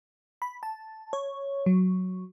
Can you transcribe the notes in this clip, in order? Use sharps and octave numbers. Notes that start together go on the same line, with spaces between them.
B5
A5
C#5
F#3